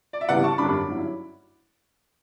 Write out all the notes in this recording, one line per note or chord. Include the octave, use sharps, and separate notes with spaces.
D5
E5
C#3 E3 G3 B3 D5 F#5
A5 C#6
F#2 D3 G3 D4 B5 D6
G2 F#3 C#4 E4